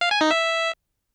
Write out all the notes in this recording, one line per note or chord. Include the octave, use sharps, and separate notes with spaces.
F5
G#5
D#4
E5